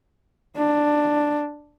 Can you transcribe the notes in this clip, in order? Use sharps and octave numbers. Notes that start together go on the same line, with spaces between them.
D4